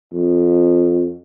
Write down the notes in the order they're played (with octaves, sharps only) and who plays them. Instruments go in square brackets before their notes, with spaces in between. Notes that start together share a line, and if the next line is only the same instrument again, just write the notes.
[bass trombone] F2